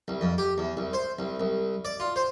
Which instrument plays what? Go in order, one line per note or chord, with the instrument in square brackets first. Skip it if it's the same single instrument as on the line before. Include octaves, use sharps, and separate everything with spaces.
[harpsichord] C2
F2
G4
E2
C2
C5
C2
C2
D5
F4
C5